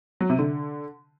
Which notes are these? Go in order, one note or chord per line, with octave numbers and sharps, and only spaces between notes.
F#3
C3
D3